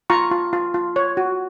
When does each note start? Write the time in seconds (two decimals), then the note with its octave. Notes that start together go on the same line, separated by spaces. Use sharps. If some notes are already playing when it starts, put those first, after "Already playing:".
0.10 F4 A#5 C#6
0.31 F4
0.53 F4
0.74 F4
0.96 C#5
1.17 F#4